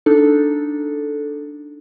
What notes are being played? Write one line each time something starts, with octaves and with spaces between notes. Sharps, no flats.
D4 D#4 A4